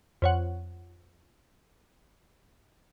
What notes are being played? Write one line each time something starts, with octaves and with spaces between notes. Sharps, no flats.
F2 C#5 F#5